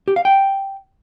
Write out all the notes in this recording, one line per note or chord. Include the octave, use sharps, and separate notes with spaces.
G4
F5
G5